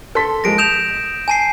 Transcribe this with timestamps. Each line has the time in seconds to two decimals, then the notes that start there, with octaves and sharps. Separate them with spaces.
0.15 A4 C6 B6
0.44 F3 G#3 A#3 A#6 D7
0.58 D#6 G6 E7 F7
1.28 G#5 A5 C7